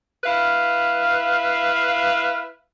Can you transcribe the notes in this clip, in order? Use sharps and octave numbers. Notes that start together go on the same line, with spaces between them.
E4 B4 F5